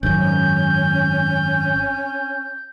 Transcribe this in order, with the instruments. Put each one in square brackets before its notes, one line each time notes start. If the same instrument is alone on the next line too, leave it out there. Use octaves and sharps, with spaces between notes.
[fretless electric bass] G#1 F#2 [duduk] C#4 [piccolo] G6